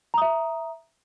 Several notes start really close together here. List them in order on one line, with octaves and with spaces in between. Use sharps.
A#5 D#6 E5